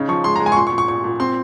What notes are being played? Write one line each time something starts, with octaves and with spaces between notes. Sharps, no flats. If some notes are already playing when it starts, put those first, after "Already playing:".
Already playing: C#3 D#4
F3 C#6
G#3 C6
A#5
G#3
G#5
C#6
A#2 C6
C#6
A#2
C#6
A#2 C#6
A#2
C4 C6